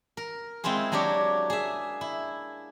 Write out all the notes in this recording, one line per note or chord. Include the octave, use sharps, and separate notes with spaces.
A#4
G#3 C4 E4 F4 G#4
F#3 A#3 D4 G4 C#5
G#4 E5
E4